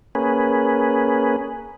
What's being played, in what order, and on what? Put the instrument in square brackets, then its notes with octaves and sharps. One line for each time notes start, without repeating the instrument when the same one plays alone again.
[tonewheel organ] A#3 C#4 G#4 B4